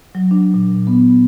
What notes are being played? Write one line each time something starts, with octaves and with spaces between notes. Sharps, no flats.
F#3
D4
A#2
B3